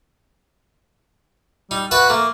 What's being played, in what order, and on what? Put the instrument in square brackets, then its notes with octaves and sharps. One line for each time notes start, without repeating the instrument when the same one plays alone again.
[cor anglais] G3 [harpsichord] D#4
[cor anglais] F#4 [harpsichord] B4 E5 A5
[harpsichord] A3 [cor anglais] A#3